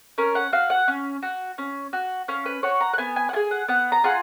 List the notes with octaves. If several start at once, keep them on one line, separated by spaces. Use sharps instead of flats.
C#4 A#4
F#5
F#4 F5
F#5
C#4
F#4
C#4
F#4
C#4 F5
B4
F#4 C#5
A#5
F#5
B3 G#5
G#5
F#5
F4 G#4 G#5
F#5
B3 F#5
A#5
F4 G#4 F#5